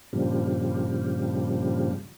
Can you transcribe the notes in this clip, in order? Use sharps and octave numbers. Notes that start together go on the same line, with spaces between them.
G2 A#2 C#3 F3 G3